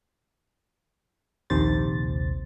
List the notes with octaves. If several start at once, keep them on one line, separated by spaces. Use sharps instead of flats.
A#1 D#2 C3 C5 A6